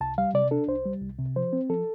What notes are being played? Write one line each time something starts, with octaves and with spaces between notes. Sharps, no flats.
C2 A5
G3 F5
C3 D5
D4 A4
C2 C5
G3
C2
C3
F3 C5
C4
F3 A4